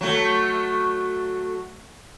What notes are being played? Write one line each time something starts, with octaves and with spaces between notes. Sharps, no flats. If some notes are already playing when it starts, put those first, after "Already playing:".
F#3 A3